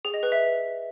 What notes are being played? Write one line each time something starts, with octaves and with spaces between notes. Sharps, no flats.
G#4
D#5
B4
E5